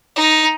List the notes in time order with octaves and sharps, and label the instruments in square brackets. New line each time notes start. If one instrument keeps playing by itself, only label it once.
[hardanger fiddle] D#4